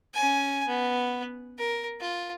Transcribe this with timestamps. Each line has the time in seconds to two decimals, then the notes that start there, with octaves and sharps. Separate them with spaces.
0.14 C#4 G#5
0.68 B3
1.58 A#4
2.00 F4